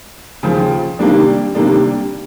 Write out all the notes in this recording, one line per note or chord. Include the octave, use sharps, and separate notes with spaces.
D#2 C#3 F3
C3 D#3 G3 A#3 D4
C3 D#3 G3 A#3 D4